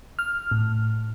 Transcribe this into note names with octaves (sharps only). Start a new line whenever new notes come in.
F6
A2